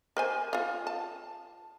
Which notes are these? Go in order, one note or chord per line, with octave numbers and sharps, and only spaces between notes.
A#4 C5 G#5
F4 F5
A5